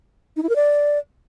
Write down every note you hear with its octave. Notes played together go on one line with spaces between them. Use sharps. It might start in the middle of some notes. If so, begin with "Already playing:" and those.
D#4
E4
A#4
D5